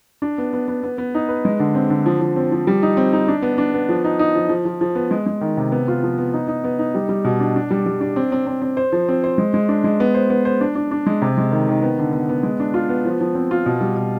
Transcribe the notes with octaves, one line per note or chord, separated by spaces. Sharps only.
D4
B3
B3
B3
B3
B3
D#4
B4
G#3
D3
C4
D3
F3
F3
C4
F3
G3
D#4
C4
D#4
D4
B3
D4
B3
F3
D#4
D#4
F3
F3
F3
F3
B3
G#3
G#3
D#3
C3
B3
F4
F3
B3
D#4
D#4
B3
D#4
G3
G3
B2
D4
D4
G3
G3
D4
C4
C4
C4
C4
C5
F3
C4
C5
G#3
G#3
D4
G#3
B3
C5
B3
C5
D4
D4
D4
G#3
C3
G#3
D#3
D#3
B3
D3
B3
B3
G#3
D4
F4
B3
F3
F3
C4
F4
B2
G3
B2